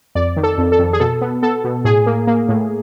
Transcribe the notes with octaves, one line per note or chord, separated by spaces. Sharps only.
F2 D5
D#3
A4
F2
A4
F2
G#4
B2 A4
B3
B3 A4
B2
A2 G#4
A#3
A#3
A2